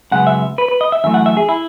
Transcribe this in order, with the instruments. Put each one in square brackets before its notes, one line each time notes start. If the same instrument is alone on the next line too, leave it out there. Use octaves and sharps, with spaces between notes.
[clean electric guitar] F#2 C#3 G#3 B3 F#5
E5
B4
B4
D#5
E5
F#2 E3 A3 E5
F#5
E5
G#4
E4